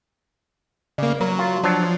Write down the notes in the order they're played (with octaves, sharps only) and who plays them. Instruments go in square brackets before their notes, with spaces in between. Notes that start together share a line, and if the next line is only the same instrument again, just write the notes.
[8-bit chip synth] C#3 A#3 [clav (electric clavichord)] D5
[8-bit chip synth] F#3 [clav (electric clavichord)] A#4
[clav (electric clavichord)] F4
[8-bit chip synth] F3 [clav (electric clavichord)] F#3 D4